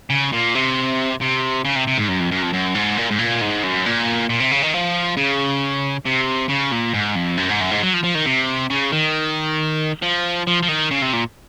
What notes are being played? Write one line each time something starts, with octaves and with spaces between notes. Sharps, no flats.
C#3
A#2
C3
C3
C#3
C3
C3
G#2
F#2
F2
F#2
F2
F#2
G#2
A#2
G#2
A#2
G#2
F#2
A#2
A#2
C3
C#3
D#3
F3
C#3
C3
C#3
A#2
G#2
F2
F#2
G#2
F#2
G#2
F#3
F3
F3
D#3
C3
C#3
D#3
F3
F3
F3
D#3
C#3
C3
A#2